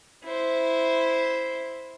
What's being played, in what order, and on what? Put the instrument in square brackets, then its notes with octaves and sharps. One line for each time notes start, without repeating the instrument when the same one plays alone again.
[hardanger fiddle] E4 C5